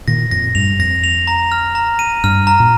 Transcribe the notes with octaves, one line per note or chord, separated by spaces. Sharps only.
A#2 D#3 A#6
F2 A#2 A#6
G2 F7
F2 A#6
F7
A#5
F6
A#5
D#7
G2 F6
A#5
A#2